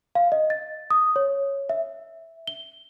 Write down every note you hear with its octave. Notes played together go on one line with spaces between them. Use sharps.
F5
D#5
A6
D#6
C#5
E5
G7